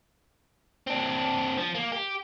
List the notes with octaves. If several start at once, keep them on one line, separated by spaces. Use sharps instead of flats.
C4 D4
F3
A#3
G4